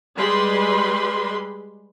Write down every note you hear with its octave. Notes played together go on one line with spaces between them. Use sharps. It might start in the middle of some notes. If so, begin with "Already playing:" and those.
G3 G#3 B4 B5 C6